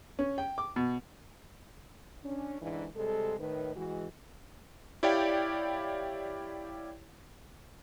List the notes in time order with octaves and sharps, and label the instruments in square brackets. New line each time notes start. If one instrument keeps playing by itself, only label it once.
[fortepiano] C#4
G5
D6
B2
[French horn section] C#4 D4
G#2 D3 E3
C3 G3 G#3 A4
A2 D#3 B4
E3 G#3 F#4
[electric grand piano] E4 G4 C#5 D5 F5 G5